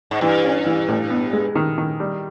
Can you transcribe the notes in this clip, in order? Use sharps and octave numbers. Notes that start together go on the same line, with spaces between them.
G#2
G2 E3
C#4
E3
A2
B3
G#3
D#3
D#3
G3